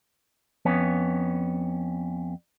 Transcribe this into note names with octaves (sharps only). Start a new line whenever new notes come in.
F2 B3 C#4